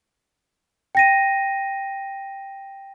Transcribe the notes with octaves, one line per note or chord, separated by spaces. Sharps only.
G5 A#6 D#7